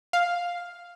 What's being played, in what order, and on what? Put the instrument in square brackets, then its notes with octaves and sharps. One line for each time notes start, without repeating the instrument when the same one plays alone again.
[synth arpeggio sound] F5